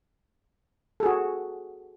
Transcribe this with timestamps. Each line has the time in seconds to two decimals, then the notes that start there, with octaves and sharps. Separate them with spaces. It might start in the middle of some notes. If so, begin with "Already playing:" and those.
1.00 A4
1.03 G#4
1.06 F#4